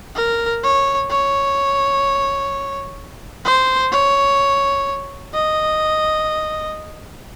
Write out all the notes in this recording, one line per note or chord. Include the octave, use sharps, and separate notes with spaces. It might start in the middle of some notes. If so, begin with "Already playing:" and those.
A#4
C#5
C#5
C5
C#5
D#5